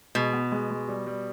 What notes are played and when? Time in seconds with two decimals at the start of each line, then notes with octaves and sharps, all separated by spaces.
0.15 B2 G#3
0.33 B3
0.52 G#3
0.70 G#3
0.89 G3
1.07 G3